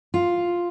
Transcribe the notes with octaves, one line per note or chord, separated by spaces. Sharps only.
F4